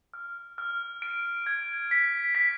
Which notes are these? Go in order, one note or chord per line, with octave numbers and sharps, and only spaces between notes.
F6
F6
D7
G#6
B6
B6